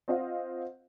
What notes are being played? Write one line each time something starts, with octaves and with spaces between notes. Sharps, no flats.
C4 F4 D#5 F5 F#5